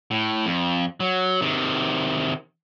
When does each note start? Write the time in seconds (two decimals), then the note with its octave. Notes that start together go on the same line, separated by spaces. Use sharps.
0.11 A2
0.46 F2
1.00 F#3
1.41 C3 D#3